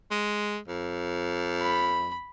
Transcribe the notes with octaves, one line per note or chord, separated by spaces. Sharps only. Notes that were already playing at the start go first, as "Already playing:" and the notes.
G#3
F2
B5